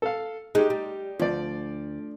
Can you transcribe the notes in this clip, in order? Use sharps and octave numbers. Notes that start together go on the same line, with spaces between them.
A4 F5
G#3 D#4 G4
G3
D2 F3 D5